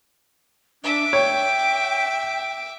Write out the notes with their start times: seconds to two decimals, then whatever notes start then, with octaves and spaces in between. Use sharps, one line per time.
0.83 D4 E5 D6
1.13 C#5 G5